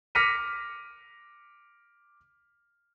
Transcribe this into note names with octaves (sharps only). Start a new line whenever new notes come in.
D6 F6 A#6 B6 C#7 D#7